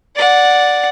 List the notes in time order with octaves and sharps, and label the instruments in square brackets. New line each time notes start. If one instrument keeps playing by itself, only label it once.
[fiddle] D5 F#5